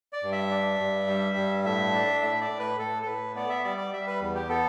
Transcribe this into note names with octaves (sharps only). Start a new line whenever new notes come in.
D5
G2
E5
D4
G2
G3
G2
A2 E5
D4
A2 E5
D5
A2
B4
A2 A4
A4
A2 B4
B3 D5
E5
G3 D5
D5
G3 E5
B4
E2
G4
B3 A4